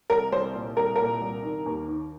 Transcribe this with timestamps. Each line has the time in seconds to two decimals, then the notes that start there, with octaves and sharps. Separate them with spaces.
0.10 C2 A#4
0.32 C2 C5
0.54 A#2
0.76 C2 A#4
0.96 A#2 A#4
1.21 C2
1.43 D#3
1.66 D#2
1.88 D#3